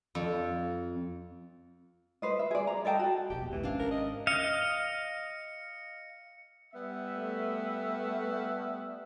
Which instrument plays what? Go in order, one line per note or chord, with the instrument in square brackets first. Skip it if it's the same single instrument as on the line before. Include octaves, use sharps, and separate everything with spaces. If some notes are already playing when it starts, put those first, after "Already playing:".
[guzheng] F2
[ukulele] B4 C5 D#5
E5
G#4 D5
A#5
A4 D#5 G5 A5
F#4
[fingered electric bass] E1 A#1 E2 [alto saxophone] G4
[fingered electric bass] C2 G#3 [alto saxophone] E3
[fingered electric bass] G#1 G#2 C#4 [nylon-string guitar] D4 C5 F5
[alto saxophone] A#4
D#5
[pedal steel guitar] D#5 F5 [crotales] C#7
[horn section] G3 B3 E5
[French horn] A3